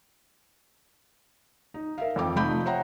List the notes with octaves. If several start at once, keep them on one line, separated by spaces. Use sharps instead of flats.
D#4
A#4 E5 F5
F2 A4 G5 D6
F1 F3 A3 D#4 B5 G6
C5 C#5 E5 F#5 G5 A#5